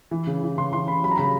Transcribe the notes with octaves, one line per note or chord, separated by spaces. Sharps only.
E3
C#3
E3
C#3 C6
E3 C6
C#3 B5
F#3 B5
A#5
C#3 B5